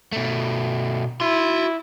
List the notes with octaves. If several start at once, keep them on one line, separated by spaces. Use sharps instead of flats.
B2 A3
E4 F#4 C6